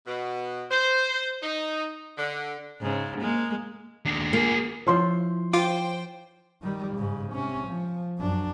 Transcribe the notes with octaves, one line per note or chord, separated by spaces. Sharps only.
B2
C5
D#4
D3
G#2 C#3
G#3 A#3
D#2 D4
A#3 F4 G#4
F3 E4 C#5 C6
F4 C5 G5 D6
D#3 G3
G#2 C#3
C3 C#4
F3
F#2 D4